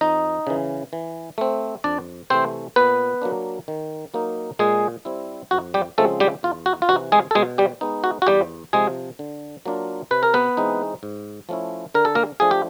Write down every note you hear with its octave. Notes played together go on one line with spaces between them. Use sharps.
F2 D#4 D#5
C#3 E3
E3
A3 C4
F2 D4 D5
C3 E3 A3 C4 C5
A#2 B3 B4
F#3 A#3 D4
D#3
F#3 A#3 D#4
A#2 G#3 G#4
G3 C4 E4
F2 F#4
G3 G4
C#3 F3 G#3 A3 C4 A4
G3 G4
E2 F4
F#4
F4
C3 E3 F#4
G#3 G#4
A4
B2 G#3 G#4
G3 G4
G#3 B3 D#4
F#4
F#4
E2 G3 G4
C3 F3 G#3 G#4
D3
F#3 A#3 D4 F4
C3 B4
A#4
B3 B4
E3 G#3 C4 D#4
G#2
F3 A3 C#4 E4
D3 A#4
A4
A#3 A#4
F3 A3 D4 G#4
G4